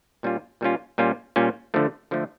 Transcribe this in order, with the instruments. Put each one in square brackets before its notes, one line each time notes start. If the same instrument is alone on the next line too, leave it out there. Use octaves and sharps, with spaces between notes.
[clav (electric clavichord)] A#2 G3 C#4 F4
A#2 G3 C#4 F4
A#2 G3 C#4 F4
A#2 G3 C#4 F4
D3 F3 A3
D3 F3 A3